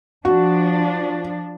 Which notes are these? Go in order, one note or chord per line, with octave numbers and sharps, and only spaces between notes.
F3 D4 F#4